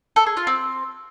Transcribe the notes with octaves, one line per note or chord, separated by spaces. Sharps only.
A4
G#4
F4
C4